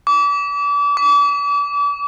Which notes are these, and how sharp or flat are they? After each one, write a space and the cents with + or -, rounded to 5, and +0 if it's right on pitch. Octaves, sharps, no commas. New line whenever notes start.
D6 -35
D6 -40